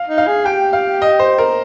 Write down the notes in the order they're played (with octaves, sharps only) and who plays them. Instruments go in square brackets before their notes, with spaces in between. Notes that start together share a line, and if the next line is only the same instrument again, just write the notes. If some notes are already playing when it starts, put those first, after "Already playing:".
Already playing: [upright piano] F5
[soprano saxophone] D#4
[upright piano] F5
[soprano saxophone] G#4
[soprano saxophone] G4 [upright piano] G5
[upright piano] F5
D#5
C5
A#4